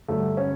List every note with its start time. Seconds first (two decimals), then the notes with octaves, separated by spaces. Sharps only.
0.08 G2 D3 F#3 A3
0.37 C#4